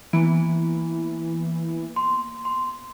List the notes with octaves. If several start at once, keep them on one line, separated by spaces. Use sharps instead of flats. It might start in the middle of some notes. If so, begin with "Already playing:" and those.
E3 A#3 B3
C6
C6